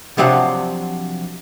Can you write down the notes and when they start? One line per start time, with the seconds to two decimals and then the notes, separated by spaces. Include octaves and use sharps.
0.18 C3 F3 F#3 D4 C5 F#5